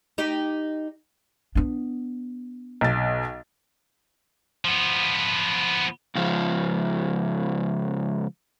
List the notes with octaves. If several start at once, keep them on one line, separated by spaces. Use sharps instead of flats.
D#4 G4
B3 D4
B1 A6
F3 B3
C#2 F3